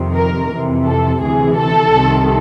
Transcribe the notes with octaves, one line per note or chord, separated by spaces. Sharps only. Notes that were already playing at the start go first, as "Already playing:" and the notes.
Already playing: F2 C3 D#3
A#4
F2 C3 E3
A4
D2 C3 E3 G#4
A4
C2 C3 D#3